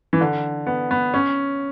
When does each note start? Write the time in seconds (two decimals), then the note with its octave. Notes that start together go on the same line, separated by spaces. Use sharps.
0.13 E3
0.21 D3
0.67 B3
0.91 B3
1.14 C#4